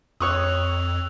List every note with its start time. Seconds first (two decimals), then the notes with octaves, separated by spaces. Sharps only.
0.20 F2 C#5 C#6 D#6 E6 F#6 F7